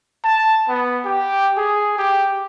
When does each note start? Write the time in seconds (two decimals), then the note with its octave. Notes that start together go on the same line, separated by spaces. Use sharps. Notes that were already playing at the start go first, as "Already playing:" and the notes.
0.25 A5
0.68 B3
1.05 G4
1.57 G#4
1.98 G4